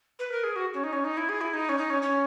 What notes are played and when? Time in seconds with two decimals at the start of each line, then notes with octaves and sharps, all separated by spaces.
0.19 B4
0.32 A#4
0.44 G#4
0.56 F#4
0.74 C#4
0.84 D#4
0.93 C#4
1.04 D#4
1.17 E4
1.29 G#4
1.41 E4
1.53 D#4
1.69 C#4
1.78 D#4
1.90 C#4
2.02 C#4